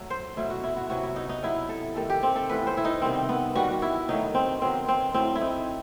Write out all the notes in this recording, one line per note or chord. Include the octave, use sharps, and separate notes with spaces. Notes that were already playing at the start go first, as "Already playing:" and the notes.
Already playing: F#3 A3 A4
C5
B2 F#3 A3 E4
F#4
E4
F#4
C3 F#3 B3 F#4
E4
D#4
D#4
C3 F#3 B3 E4
A4
C3 D#3 A3 A4
G4
C4
A4
A2 E3 B3 B4
C5
E4
D#4
C3 D#3 G3 B3 C4
B3
D#3 G3 B3 F#4
F#4
E4
D#3 F#3 A3 D#4
C4
D#3 F#3 B3 C4
C4
A2 F#3 A3 C4
E4
D#4